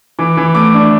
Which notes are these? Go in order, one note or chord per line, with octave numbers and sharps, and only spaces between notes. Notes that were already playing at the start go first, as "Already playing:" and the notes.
E3 D6
E3
A3 D6
D4